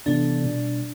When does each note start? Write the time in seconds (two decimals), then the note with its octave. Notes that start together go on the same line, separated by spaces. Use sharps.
0.06 C3 E3 B3 D4 F4 A4
0.43 B2 G3 D4